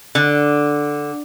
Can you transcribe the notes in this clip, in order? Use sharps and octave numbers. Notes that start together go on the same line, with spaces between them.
D3